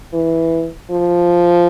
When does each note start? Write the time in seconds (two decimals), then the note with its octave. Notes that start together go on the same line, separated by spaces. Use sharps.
0.13 E3
0.91 F3